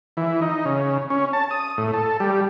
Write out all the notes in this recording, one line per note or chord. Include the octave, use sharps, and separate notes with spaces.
E3
D#4
C#3
C#4
A5
D#6
A2
A4
G3